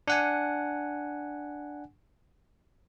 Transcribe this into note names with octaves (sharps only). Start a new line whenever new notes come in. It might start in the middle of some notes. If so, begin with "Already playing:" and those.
D4 F#5 G#5